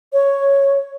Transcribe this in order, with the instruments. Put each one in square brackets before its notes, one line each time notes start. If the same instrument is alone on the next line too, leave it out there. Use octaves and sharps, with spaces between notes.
[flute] C#5